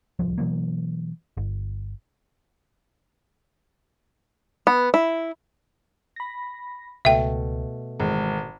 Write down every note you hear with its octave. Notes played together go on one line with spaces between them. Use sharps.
D1 C2 F3
B2 E3 F#3 A#3
G1
B3
E4
B5 A#6
C#2 B2 A3 E5 G5
G#1 E3 G#3